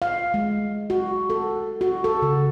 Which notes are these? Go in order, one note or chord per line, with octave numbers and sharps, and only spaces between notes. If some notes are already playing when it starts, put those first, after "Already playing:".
F5
G#3
F#4
A4
F#4
A4
C#3